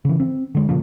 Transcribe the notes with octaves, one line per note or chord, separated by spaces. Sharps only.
C#3 E3
C4
D3 G#3
A#2 C#3 F3 A#3